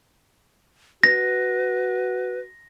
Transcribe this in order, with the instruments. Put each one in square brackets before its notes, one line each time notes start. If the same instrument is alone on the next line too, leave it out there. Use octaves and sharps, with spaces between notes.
[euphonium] F#4 [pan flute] B4 [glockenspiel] A#6